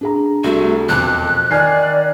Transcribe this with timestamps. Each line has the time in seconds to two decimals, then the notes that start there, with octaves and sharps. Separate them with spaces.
0.01 D4 G#4 A#5
0.44 C2 A3 F#4
0.89 E1 F2 A5 D6 F#6
1.51 D#3 D5 G#5 F6 G#6 C7